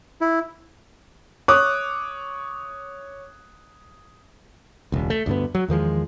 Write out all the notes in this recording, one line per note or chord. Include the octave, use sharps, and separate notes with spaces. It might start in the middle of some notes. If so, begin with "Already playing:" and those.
E4
C#5 D6 D#6 F#6
E1 C#2
A3
D2 G2 D3 B3
F#3
E2 D#3 F3 G#3